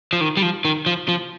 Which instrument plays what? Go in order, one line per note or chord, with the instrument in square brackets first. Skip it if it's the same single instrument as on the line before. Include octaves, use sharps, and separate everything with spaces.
[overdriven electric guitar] F3
D#3
G3
F3
D#3
F3
F3